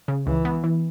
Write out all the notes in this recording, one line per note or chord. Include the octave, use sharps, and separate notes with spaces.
C#3
C#2 E3
B3
E3